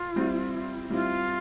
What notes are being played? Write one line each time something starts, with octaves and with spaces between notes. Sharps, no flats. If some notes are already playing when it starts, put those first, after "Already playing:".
Already playing: F4
G3 C4 E4
G3 C4 E4 F4